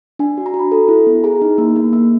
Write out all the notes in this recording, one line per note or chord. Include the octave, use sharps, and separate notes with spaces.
D4 G#5
F#4
A#5
F#4
B5
A4
E4
B3
G#4 A#5
D#4
A#3
A#3
A#3